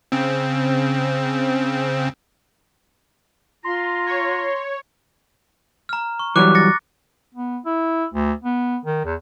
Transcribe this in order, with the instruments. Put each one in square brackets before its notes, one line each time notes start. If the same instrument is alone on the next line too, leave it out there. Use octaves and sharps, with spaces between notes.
[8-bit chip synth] C#3 C4
[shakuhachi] F4 [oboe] A#5 [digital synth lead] C6
[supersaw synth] C#5
[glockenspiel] A#5 F6
C#6
[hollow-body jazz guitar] E3 F#3 G3 [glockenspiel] D6 F#6
[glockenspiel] A6 A#6 C#7
[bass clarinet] B3
E4
D2
B3
D#3
E2